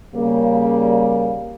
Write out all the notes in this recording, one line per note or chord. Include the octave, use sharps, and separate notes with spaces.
C#3 G3 A#3